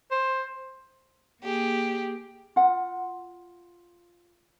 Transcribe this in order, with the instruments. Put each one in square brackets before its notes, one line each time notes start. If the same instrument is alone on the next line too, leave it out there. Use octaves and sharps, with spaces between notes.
[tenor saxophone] C5
[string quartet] A#3 G4 G#4
[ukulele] F4 F#5